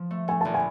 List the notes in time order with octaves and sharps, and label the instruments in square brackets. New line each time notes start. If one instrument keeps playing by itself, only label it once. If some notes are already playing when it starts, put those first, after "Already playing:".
Already playing: [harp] F3
A3
[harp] A3 [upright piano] G#5
[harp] A#1 [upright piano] A5
[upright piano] G#5